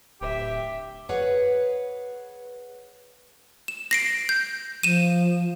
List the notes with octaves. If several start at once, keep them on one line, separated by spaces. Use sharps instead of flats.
D1 G4 E5
G#4 B4 C#5 F#5
E7
A#6 C7 D7
G6
F3 D#7 E7